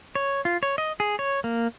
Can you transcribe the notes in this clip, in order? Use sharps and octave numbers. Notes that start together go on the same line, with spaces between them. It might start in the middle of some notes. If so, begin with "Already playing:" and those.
C#5
F4
C#5
D#5
G#4
C#5
A#3